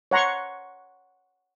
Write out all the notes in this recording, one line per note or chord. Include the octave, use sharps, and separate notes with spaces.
C#5 F#5 A#5 C6 C#6